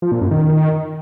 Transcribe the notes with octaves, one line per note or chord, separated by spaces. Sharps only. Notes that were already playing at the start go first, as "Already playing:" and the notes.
F3
A#2
F#2
D#3